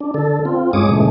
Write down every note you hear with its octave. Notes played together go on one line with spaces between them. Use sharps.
D4
D3 A4
C4 F4
G2 G#3 C#5 D6 D#6
A#2 C#3 E3 G#3 A3